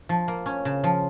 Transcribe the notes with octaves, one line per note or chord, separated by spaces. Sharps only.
F3
A#3
C#4
C#3
F3